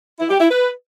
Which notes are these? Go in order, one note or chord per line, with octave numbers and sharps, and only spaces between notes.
E4
G4
E4
B4